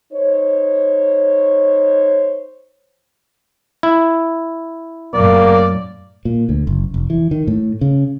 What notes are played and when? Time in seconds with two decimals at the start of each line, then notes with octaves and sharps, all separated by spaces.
0.14 D#4 C5 C#5
3.83 E4
5.14 F#2 A2 A#3 D5
6.25 A#2
6.49 D2
6.67 F#1
6.94 F1
7.10 E3
7.31 D#3
7.47 A2
7.81 C#3